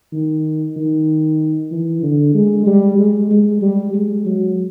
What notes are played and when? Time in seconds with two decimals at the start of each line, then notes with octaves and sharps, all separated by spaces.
0.12 D#3
0.77 D#3
1.71 E3
2.03 D3
2.34 G#3
2.66 G3
2.99 G#3
3.30 G#3
3.62 G3
3.94 G#3
4.25 F#3